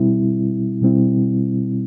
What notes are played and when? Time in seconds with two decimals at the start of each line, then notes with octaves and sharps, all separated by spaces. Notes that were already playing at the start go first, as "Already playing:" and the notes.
Already playing: B2 G3 C4 E4
0.81 B2 G3 C4 E4